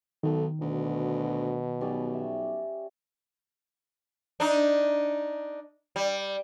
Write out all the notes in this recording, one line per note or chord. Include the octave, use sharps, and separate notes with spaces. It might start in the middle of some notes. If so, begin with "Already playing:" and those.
B1 D#3 A4
D2 B2
B1 G3 C#4 D5
E5
D4 D#4
G3